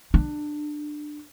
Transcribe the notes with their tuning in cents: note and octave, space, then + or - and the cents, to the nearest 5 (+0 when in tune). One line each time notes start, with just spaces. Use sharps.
D4 +20